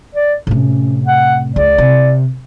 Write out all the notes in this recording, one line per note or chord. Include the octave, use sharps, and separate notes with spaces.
D5
A2 C3 C#4
F#5
C#2 D5
C3